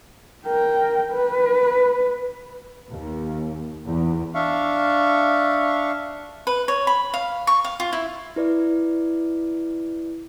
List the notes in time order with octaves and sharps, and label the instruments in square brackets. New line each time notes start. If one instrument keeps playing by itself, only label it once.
[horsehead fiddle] A#4 G5
B4
[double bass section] D#2
E2
[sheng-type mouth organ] D4 E5 F5 C#6
[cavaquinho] B4
C#5
B5
F5
C#6
F5
F4
E4
[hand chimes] E4 B4 D5